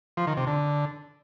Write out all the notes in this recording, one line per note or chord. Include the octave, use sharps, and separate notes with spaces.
F3
D#3
C3
D3